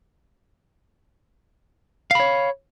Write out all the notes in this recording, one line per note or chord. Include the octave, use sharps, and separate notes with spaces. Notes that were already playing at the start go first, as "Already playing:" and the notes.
C#5 F5 B5